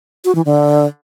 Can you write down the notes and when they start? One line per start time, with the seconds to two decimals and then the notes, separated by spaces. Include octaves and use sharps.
0.25 F#4
0.35 E3
0.45 D3